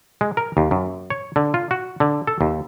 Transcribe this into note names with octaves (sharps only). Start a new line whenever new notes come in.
G#3
A#4
D#2
F#2
C#5
D3
F4
F#4
D3
A4
D#2